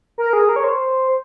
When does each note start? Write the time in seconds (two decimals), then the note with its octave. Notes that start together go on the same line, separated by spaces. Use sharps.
0.18 A#4
0.33 G#4
0.49 A#4
0.56 C#5
0.64 C5